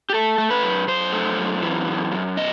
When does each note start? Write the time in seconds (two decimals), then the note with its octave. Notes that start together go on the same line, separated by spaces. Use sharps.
0.10 G4
0.14 A3 A4
0.38 A3
0.50 B4
0.63 F#2
0.88 F#2 C5
1.13 A3
1.38 F#2
1.62 E3
1.87 F#2
2.12 F#2
2.37 B2 D#5